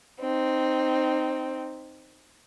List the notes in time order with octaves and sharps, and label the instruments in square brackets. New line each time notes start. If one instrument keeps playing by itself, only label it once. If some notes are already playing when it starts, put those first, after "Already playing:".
[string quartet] C4 D#4